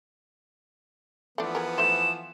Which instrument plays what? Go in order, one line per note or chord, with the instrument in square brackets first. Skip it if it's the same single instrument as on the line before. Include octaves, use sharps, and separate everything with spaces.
[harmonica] E3 F3 B3 [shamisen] A3 D4
[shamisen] G#4 A#4
[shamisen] A3 D#4 C5 [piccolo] E7